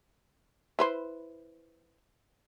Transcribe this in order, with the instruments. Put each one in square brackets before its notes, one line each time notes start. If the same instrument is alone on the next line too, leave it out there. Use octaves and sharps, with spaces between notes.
[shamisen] E4 B4 C5